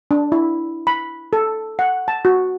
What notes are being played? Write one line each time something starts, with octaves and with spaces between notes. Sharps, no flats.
D4
E4
B5
A4
F#5
A5
F#4